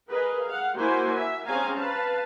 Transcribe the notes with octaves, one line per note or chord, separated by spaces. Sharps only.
G#4 A#4 B4 D#5
F5 F#5
A#3 E4 F#4 C5 G#5
E5
C4 C#4 G#4 F5 G#5 A#5
B4 F5 A5